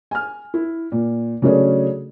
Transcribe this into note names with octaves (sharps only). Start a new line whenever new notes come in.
G#5 F6
E4
A#2
C#3 F#3 A3 C#4 D4 G#4